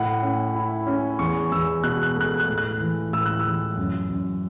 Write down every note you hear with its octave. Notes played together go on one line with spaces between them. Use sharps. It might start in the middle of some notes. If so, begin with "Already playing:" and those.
Already playing: A2 F#5
C#4
E4
C#4
E2 C#6
E2 E6
B2 F#6
F#6
A3 F#6
F#6
A2
F#6
E3
A2 E6
F#6
E6
E3
F#2
F#2